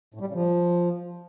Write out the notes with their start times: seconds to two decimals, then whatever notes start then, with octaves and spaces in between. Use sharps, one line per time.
0.14 A2
0.21 G3
0.27 C#3
0.34 F3